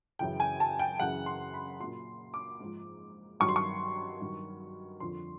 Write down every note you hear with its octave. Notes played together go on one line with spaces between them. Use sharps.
F#2 C#3 E3 G5
G#5
A5
G5
F#2 C#3 E3 F#5
C6
B5
A#2 F#3 C6
D6
G#2 F3
G2 D#3 F#3 C#6
C6
C#6
G2 D#3 F#3
F2 D3 F3 C6